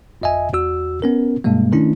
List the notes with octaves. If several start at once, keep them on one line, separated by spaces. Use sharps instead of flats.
G1 F2 D#5 E5 G#5
E2 F#4 E6
B3 C#4 A#4
G2 B2 G3 G#3 A#3
D#3 A3 C#4 D4 E4